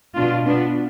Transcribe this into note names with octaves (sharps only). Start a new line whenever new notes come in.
B2 D4 F4
B3 D4